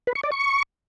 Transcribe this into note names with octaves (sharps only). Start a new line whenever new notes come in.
B4
C#6
D5
C#6